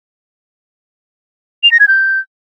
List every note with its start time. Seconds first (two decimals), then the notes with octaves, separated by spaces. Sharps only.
1.63 F7
1.72 A#6
1.80 G#6
1.88 G6